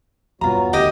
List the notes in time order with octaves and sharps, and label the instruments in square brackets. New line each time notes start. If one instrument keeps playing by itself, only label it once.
[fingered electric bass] E2 G2 B2 [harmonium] F#3 B3 F#4 [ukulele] F4 A#5
[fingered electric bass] D#1 D2 D#3 [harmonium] G#3 [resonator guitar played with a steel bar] G4 D#5